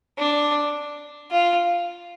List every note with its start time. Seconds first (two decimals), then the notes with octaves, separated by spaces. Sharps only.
0.18 D4
1.32 F4